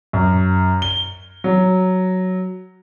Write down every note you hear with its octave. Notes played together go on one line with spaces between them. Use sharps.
F#2
G7
F#3